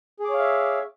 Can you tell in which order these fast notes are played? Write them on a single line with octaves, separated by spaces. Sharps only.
G#4 D6 C#5 F5 E5